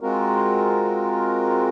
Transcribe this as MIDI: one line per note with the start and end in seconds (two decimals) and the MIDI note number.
0.01 1.69 56
0.01 1.69 60
0.01 1.69 65
0.01 1.69 66
0.01 1.69 70